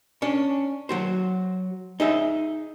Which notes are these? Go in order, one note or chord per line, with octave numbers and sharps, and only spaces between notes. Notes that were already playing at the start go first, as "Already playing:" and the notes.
C#4 D4
F#3 F#4 C5
D#4 G#4 E5